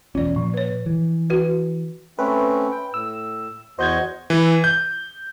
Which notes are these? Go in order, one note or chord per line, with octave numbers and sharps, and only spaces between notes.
E1 E2 C#4 F4 D5
A#2 F3
B4 C#5
E3
F#4 B4
A3 C4 C#4 B4
G5
A2 E6
E2 F#4 C5 D#5 G6 G#6
E3
G6